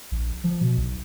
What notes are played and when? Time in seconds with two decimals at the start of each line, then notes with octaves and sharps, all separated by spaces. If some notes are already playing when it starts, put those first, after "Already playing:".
0.11 A#1
0.44 F3
0.61 B2
0.78 B1